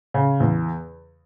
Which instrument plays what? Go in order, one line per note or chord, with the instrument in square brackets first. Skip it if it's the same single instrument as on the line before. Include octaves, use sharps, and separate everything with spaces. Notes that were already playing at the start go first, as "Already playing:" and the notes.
[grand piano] C#3
E2